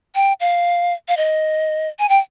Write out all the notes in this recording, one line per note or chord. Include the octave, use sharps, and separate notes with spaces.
G5
F5
F5
D#5
G#5
G5